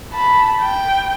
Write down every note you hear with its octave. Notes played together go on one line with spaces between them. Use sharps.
A5 B5
G5